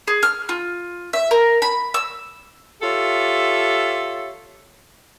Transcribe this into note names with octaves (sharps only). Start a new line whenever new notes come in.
G#4
F6
F4
E5
A#4
B5
E6
F4 G4 A4 C#5 E5